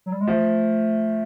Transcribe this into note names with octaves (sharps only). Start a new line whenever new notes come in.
F#3
G3
G#3
F3 A3